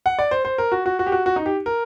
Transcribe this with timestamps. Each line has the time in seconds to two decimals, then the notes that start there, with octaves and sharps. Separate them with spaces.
0.06 F#5
0.19 D5
0.31 C5
0.45 C5
0.58 A#4
0.72 F#4
0.86 F#4
0.99 F#4
1.06 G4
1.12 F#4
1.26 F#4
1.36 D#4
1.46 G4
1.66 A#4